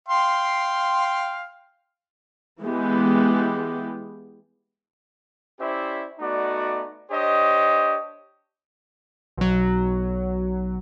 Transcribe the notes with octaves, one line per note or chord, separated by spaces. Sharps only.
F5 G5 C6
E3 G#3 B3 G4
C#4 E4 G4 C5 D5 E5
A3 B3 D#4 F#4 D5
D4 G4 C5 C#5 D#5
B1 F#3